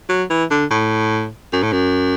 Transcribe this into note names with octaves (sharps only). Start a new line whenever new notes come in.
F#3
E3
D3
A2
F#2
A2
F#2